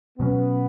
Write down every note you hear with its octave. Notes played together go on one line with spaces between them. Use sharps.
B2 F#3 B3 C#4